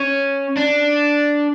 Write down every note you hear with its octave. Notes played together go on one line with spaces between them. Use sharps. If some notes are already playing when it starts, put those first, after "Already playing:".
Already playing: C#4
D4